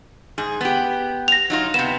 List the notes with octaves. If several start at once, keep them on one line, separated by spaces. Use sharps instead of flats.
G#2 G#4
B3 G4
A#6 F7
F#3 D#4 F4
C3 B3 E7